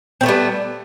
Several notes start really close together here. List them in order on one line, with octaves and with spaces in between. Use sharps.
C4 A3 B3 G3